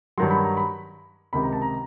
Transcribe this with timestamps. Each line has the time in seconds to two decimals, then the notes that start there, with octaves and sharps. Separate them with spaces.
0.18 G2 D#3 F#3 C6
0.31 B5
0.44 A#5
0.57 B5
1.33 C#2 C3 D#3 B5
1.43 A#5
1.53 A5
1.62 A#5